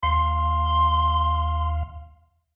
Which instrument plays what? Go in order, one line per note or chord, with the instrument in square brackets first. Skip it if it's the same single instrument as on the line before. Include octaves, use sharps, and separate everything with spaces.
[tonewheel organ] D#2 F5 [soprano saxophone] C6